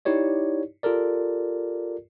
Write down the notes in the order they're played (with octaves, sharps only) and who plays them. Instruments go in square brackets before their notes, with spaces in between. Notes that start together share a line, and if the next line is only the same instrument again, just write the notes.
[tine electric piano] D#4 E4 G4 C#5 D5
F4 G4 A4 A#4 D5